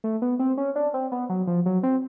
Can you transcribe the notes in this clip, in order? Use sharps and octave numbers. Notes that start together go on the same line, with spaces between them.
A3
B3
C4
C#4
D4
C4
B3
F#3
F3
F#3
C4